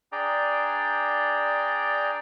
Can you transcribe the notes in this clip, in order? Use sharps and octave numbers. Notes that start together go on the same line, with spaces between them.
D4 G#4 D5 G5 A#5